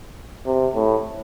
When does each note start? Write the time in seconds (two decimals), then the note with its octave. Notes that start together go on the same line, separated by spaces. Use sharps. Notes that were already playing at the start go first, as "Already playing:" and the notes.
0.46 C3
0.75 A2